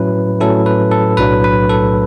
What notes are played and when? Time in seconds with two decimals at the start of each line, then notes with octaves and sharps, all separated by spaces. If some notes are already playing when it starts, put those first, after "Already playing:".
Already playing: A2 F#3 C#4 E4 B4
0.40 A2 F#3 C#4 E4 A4
0.66 B4
0.91 A4
1.17 B1 A2 F#3 A3 D4 B4
1.44 B4
1.69 A4